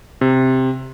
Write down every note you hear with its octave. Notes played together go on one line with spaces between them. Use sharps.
C3